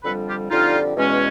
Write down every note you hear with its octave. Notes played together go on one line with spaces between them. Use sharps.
F2 D3 G3 A4 B4
F4 G4
F2 D3 G3 D#4 F4
E2 B2 G#3 C#4